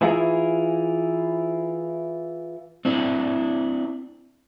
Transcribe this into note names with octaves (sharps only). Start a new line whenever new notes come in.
E3 E4 F4 G#4 A#4
C4 D4 E4